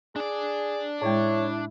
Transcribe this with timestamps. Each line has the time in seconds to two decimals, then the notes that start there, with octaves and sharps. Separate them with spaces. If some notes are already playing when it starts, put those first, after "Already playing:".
0.16 D4 G#4 D5
1.02 A2 G#3 E4 C#5